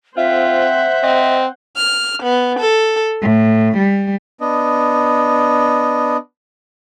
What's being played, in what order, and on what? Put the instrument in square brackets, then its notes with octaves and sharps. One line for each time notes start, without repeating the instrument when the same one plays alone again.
[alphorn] C4 [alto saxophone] F4 [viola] C5 F#5 [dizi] E5
[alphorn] C4 [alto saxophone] D#5
[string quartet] F6
B3
A4
A2
G3
[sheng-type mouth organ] B3 D4 D#5